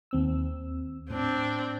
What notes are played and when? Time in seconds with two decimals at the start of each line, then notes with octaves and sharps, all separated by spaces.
0.11 D#2 C4 E6
1.10 A2 C4 D4